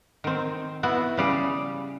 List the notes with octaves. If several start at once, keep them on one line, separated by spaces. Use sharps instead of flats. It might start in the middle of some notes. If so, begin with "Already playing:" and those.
D#3 C4
B3 E4 F#4
C#3 G3 G#4